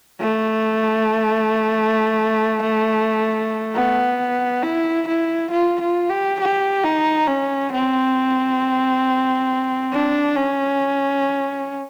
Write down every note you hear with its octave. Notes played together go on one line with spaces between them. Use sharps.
A3
B3
E4
E4
F4
F4
G4
G4
D#4
C#4
C4
D4
C#4